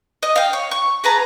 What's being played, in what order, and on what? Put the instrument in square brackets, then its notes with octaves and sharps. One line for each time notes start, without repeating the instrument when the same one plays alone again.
[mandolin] D#5
F5 G5
C#5
C#6
G#4 B4 A5 A#5